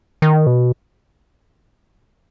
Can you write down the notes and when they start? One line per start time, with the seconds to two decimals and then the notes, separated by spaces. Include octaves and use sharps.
0.22 D#3
0.47 B2